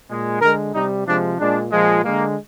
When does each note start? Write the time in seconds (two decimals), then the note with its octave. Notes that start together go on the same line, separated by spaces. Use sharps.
0.10 A#2 G#3
0.41 D3 G#3 A#4
0.74 C3 G3 D#4
1.07 C3 F3 G#3 D4
1.39 A#2 G#3 D4
1.72 A#2 F3 G#3
2.04 D3 G#3 A#3